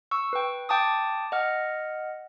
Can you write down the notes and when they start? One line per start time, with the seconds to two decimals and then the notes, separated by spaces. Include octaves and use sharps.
0.11 C#6 E6
0.33 B4 G5
0.69 G5 A5 D6 D#6
1.32 D#5 F#5 F6